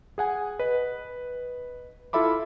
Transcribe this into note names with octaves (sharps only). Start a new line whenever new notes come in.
G#4 F#5 G#5
B4 D#5
E4 F4 A4 E5 B5 D6